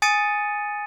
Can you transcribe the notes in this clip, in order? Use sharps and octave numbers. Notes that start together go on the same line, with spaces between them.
G#5 D#6 A6 C#7 D#7